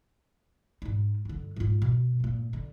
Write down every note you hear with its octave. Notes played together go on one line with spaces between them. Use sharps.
G#2 D#4
G2 D3
G#2 F4
B2
G1 A#2
D3